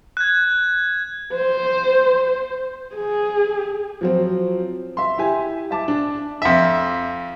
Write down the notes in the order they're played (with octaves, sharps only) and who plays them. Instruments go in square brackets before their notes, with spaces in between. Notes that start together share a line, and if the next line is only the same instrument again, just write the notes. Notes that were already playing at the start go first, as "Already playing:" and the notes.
[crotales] F#6 G#6
[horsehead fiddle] C5
G#4
[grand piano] F3 F#3 C4
E5 C6
E4 G4 G#5
E5 A5 D6
D4
[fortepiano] F2 E5